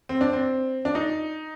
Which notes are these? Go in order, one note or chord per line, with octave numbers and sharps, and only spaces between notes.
C4
D4
C4
D4
D#4